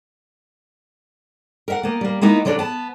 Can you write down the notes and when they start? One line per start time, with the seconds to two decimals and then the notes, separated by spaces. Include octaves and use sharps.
1.68 A#4 E5 F#5
1.83 A#3 B3
2.01 G3 A#3
2.21 G#3 A#3 B3 D#4 E4
2.45 D3 F#3 C#4 D4 A4
2.59 B3 A5